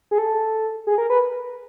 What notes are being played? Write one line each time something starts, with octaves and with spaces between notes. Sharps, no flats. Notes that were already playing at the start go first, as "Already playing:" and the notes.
G#4
A4
G#4
A#4
B4